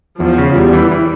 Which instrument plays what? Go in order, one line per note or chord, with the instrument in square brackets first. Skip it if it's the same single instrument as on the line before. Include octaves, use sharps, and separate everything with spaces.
[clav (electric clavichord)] E2 [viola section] F3
[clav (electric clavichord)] C#3
[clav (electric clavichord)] E2 [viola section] G3
[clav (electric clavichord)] E3
E3